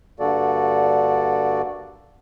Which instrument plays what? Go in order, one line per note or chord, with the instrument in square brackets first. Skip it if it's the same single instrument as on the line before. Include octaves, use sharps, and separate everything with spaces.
[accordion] G2 D3 A#3 F#4 A4 D5